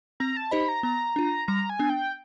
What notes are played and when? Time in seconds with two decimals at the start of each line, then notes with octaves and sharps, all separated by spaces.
0.20 C4 A#5
0.37 A5
0.51 D#4 G4 C5 D#5 B5
0.68 A#5
0.83 B3 A#5
1.16 D4 F4
1.48 G3 A#5
1.70 G#5
1.79 B3 D4
1.90 G5